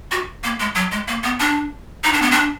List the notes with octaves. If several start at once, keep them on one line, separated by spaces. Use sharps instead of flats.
F#4
A#3
G#3
F#3
G#3
A#3
B3
D4
D#4
D4
B3
D4